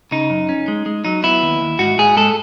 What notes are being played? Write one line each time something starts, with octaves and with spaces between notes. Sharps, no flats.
C#3 D#4
F#2
C#4
G#3
G#3
F#3 D#4
B3 E4
D#2
D#2
G#2 F#4
G#2 G#4
G#3 A4